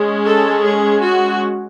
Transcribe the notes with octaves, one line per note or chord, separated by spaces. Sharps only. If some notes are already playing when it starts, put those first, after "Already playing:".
Already playing: G#3 C#4
A4
G#4
F#4